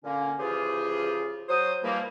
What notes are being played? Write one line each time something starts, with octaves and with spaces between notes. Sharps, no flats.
A#2 D3 A#3 C#4
C#3 E3 F3 F4 G4 G#4
F#3 C5 D#6
D#2 E3 F3 G3 A#3